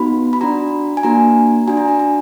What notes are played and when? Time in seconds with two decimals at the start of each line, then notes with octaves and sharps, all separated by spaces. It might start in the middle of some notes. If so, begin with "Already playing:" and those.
Already playing: B3 D#4 F#4 B5
0.33 B5
0.41 D4 F#4 A#5
0.97 G#5
1.03 A#3 D4 F#4 A#5
1.68 D4 F#4 G#5
1.77 A#5
1.88 A#5
1.99 A#5